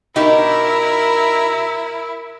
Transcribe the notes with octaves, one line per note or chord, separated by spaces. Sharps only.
B2 D#4 E4 G4 A#4 E5